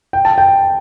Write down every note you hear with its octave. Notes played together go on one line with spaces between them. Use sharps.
G5
A5
G5